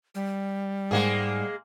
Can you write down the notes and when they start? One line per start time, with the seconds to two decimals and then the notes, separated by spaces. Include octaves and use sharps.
0.15 G3
0.91 G#2 G#3 A#3 G#4 F#5 G#5